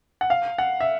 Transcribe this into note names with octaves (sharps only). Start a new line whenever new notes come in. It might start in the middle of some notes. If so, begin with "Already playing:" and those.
F#5
F5
F#5
E5